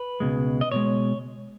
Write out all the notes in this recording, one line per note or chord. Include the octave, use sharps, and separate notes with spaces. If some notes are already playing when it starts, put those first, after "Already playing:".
Already playing: B4
C#2 B2 G#3
D#5
B2 G#3 C#5